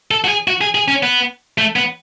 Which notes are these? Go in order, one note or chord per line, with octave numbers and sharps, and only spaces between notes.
A4
F#4
G#4
F#4
G#4
G#4
C#4
B3
A3
B3